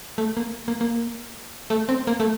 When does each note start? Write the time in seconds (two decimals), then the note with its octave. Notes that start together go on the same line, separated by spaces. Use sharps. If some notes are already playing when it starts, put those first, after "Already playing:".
0.18 A3
0.37 A#3
0.68 A#3
0.81 A#3
1.70 A3
1.89 C4
2.07 A#3
2.20 A3